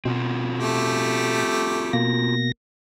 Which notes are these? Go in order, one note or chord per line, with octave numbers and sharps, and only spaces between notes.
B2 C4 F4 F#4
A3 G4
B2 A#3 A#6